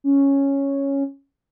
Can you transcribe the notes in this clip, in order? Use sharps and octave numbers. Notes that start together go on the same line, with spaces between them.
C#4